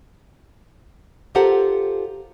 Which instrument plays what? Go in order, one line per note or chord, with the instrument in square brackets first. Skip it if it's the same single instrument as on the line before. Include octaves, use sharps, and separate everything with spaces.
[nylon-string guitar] F4 G4 A4 A#4 C5 F#5